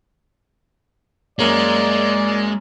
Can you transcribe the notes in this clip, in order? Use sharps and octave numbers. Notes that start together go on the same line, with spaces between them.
F#2 G#3 A#3 C#5 D5